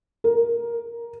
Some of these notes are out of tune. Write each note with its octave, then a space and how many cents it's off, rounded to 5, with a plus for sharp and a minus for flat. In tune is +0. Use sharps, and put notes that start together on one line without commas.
A#4 +10